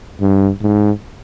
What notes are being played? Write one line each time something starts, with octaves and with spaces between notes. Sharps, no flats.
G2
G#2